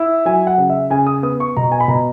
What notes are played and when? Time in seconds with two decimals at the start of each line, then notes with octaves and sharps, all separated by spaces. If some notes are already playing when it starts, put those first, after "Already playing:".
Already playing: E4
0.25 F#3 G#5
0.47 F#5
0.58 C#3
0.70 E5
0.90 C#3 G#5
1.07 D#6
1.23 B3 D#6
1.40 C#6
1.57 B2 A#5
1.72 G#5
1.80 B5
1.88 B2 A#5